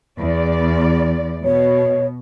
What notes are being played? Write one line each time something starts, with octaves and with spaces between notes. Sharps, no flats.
E2 D5
B2 C#5